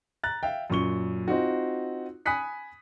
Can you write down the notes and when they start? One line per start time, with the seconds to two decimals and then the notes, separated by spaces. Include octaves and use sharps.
0.24 A#5 F#6 A6
0.43 E5 F5 G5
0.70 F#2 A#2 C#6 G7
1.28 C4 D#4 F4 F#4
2.26 G#5 B5 D#6 F#6 B6 C#7